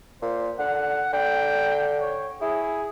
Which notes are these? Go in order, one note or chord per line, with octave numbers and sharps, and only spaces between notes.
A#2 C5
D3 F#5
D3 G5
C#5
E4 G#4